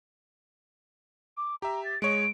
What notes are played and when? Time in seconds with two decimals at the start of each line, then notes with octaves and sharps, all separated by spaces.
1.37 D6
1.62 G4 E5 A#5
1.85 A6
2.02 G#3 C#5 D#5 D7